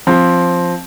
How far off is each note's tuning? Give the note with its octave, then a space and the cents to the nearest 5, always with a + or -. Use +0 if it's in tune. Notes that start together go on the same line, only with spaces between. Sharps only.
F3 +0 C4 +5